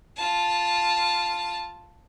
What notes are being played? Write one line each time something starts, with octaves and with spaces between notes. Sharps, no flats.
F4 A5